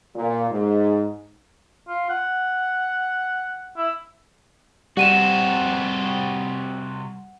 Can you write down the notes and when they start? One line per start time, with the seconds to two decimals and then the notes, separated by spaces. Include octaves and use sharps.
0.15 A#2
0.50 G#2
1.88 F4
2.09 F#5
3.77 E4
4.97 C3 G3 F#4 F#5 D#7 E7